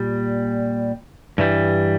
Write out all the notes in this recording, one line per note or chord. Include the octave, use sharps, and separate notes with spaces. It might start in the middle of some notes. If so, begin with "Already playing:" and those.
Already playing: A#2 G3
G2 E3 G3